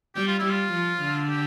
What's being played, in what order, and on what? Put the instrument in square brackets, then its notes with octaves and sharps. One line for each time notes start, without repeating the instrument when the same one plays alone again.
[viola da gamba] G3 [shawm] G4
[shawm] F4
E4
[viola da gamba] G3
[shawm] F4
[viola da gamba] F3
D3
[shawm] G4